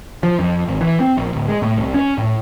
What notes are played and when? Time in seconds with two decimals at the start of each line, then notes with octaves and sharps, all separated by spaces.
0.23 F3
0.39 F2
0.67 G#1
0.81 E3
1.00 C4
1.17 A#1
1.32 D1
1.48 G#3
1.62 A2
1.77 C2
1.94 C#4
2.18 A2